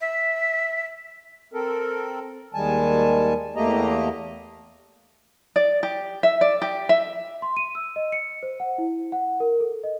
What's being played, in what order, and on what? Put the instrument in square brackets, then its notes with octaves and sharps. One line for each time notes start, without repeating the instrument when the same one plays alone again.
[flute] E5
[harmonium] C4 A4 A#4
D#2 D#3 G3 G#3 G#5 A5
E2 A3 A#3 G4 D#5 A#5
[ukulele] D5
G4
E5
D5
G4
E5
[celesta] C6
D#7
E6
D#5
C#7
C5
F#5
E4
F#5
A#4
A4
D#5